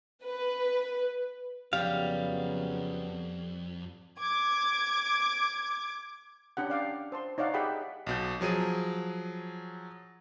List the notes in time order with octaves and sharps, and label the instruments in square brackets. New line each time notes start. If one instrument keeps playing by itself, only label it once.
[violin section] B4
[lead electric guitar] F2 [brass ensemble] C#3 F#3 B3 [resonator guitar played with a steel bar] G3 [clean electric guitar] F5
[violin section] D6 G#6
[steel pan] C#4 D4 G4 F#5
D5 F5 G5 D6
C5 A5 C6
D#4 C#5 D5 F5 F#5
G4 G#4 E5 F#5 G5 B5
[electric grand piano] B1 B2 G6
F3 F#3 G#4 D#7